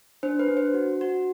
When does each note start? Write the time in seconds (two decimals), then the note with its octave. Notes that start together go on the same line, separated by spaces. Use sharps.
0.23 D4 C5
0.39 B4
0.48 D4
0.57 C5
0.74 F#4
1.01 F#4